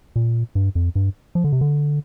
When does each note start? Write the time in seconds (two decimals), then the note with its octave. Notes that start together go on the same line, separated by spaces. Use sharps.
0.16 A#2
0.55 G2
0.75 F2
0.95 G2
1.35 F3
1.44 D3
1.52 C3
1.61 D3